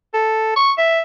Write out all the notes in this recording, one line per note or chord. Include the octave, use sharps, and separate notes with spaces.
A4
C#6
E5